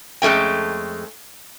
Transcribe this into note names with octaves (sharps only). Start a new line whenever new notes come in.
F2 G#3 A3 C#4 G5